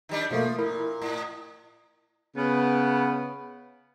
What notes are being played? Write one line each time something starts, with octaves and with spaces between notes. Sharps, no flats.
D#3 G3 D4
B2 F3 A3 A#3
A#2 E4 A#4
A2
C#3 B3